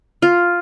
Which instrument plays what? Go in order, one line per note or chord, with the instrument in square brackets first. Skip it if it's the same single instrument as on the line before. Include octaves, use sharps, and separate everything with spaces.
[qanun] F4